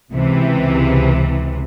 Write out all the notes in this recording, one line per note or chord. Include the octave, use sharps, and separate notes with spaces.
C#2 C3 E3